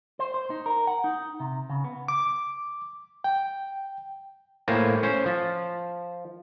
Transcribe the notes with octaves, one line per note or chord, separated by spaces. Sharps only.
C5
C5
D#4
A#4
F#5
D#4
C3
C#3
B3
D6
G5
A2 A#3 C5 G#5
C#4 C5
F3